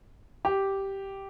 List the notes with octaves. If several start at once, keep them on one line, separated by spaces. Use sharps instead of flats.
G4